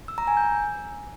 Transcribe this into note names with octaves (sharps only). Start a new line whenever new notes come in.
E6
A#5
G#5
G6